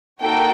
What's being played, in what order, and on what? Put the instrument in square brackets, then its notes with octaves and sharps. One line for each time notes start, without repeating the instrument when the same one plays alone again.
[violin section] A#3 D#4 F#4 A4 G5